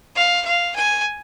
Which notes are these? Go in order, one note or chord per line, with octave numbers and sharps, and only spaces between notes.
F5
F5
G#5